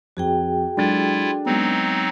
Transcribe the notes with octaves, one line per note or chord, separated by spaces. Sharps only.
F2 F#4 G#4 G5
F#3 G#3 D4 E4 F4 A4 A6
F#3 G#3 B3 C4 D#4